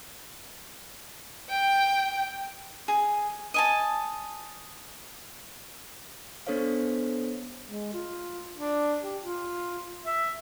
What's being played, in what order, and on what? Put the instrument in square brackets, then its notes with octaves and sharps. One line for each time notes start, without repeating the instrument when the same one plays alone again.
[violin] G5
[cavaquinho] G#4
D#5 G#5 A5
[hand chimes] B3 D4 A4 C5 C#5 F5
[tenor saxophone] G#3
F4
D4
G4
F4
E5